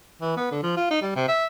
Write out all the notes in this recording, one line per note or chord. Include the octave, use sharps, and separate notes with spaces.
E3
B3
D3
F3
F4
D#4
G3
C3
E5